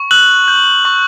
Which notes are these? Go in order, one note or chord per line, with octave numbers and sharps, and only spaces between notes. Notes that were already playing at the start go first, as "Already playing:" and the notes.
Already playing: C#6
E6 F#6 F#7
G6
C#6